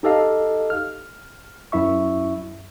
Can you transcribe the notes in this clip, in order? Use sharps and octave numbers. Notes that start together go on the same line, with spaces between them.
D#4 G4 A4 D#5 F5
F6
F#2 E4 E5 C#6